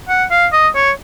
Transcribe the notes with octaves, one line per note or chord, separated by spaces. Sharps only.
F#5
F5
D#5
C#5